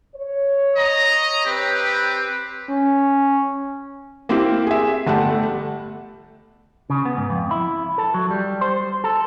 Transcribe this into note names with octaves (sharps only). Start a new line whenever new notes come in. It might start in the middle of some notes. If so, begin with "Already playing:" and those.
C#5
D#5 A#5
C4 G4 B4
C#4
A#3 C4 E4 G4
G#4 E5
G1 A3 G4 F#5 A5
C#3
B3
G#2
F2
E4
A4
F#3
G3
C5
A4